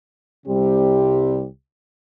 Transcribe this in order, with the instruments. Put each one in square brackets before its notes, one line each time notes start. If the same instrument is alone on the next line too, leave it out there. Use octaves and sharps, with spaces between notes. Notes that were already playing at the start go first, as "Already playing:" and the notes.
[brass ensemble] C2 C3 G3 C4 G4